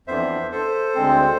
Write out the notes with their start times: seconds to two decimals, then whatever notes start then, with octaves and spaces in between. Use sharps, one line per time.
0.07 F2 E3 B3 D4 C5 E5
0.52 A4 C5
0.95 D2 D3 G#3 C4